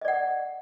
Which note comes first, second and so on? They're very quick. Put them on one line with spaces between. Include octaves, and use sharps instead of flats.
D#5 D5 F#5